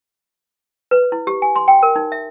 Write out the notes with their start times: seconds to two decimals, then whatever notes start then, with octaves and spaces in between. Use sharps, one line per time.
0.91 B4
1.12 E4
1.27 G4
1.42 G#5
1.56 C6
1.68 G5
1.83 A#4
1.96 D#4
2.12 E5